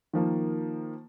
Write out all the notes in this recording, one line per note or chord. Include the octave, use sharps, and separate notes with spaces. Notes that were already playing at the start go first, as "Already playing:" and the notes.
D#3 F3 A#3